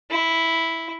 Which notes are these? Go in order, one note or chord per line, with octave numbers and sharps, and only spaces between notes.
E4